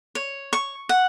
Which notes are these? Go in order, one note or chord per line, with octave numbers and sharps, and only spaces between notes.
C#5
C#6
F#5